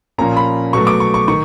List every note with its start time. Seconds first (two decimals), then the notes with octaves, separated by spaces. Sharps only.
0.18 A#2 F3 A#3 C#4 A#5
0.37 B5
0.73 B2 F#3 A3 C#6
0.87 D6
1.00 C#6
1.14 C#6
1.28 D#3 C#6